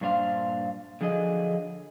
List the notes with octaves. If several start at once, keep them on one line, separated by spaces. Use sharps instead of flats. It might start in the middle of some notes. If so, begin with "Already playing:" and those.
G2 A#2 D4 C5 F5
D3 F3 F#3 G#4 D#5